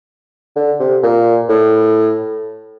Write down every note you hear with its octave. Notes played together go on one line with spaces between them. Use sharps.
D3
C3
A#2
A2